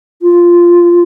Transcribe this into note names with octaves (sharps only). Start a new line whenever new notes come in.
F4